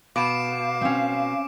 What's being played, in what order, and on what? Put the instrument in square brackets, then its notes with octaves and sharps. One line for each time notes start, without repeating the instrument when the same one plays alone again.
[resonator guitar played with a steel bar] B2 [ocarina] F5 [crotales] D6 D7 E7
[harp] C4 C#4